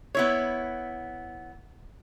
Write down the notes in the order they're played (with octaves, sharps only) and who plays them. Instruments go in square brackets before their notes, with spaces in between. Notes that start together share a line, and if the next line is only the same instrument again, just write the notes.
[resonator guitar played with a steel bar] B3 E4 C#5